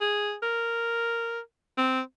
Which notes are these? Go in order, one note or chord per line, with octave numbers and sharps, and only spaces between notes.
G#4
A#4
C4